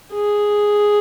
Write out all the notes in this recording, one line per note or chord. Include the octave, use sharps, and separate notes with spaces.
G#4